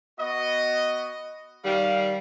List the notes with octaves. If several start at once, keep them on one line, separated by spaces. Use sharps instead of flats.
B3 F#4 D#5
D#3 G3 F5